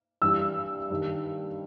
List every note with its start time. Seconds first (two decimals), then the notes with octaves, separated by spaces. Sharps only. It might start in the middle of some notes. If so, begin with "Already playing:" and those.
0.22 G2 E3 G3 E6
0.90 G2 D#3 G3